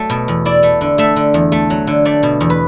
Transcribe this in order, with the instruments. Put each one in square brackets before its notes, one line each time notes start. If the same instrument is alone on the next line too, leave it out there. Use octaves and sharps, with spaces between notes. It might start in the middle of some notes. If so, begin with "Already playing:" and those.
Already playing: [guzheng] F#3 A3
B2
E2
E4 D5
A3
D3
A3 E5
D3
E2
A3
F#3
D3
A3 D5
B2
E2
B4